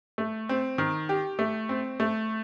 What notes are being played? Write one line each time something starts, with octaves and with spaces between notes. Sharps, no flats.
A3
C4
D#3
G4
A3
C4
A3